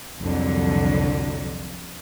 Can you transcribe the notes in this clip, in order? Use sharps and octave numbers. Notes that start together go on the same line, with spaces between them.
C2 F2 D3 F#3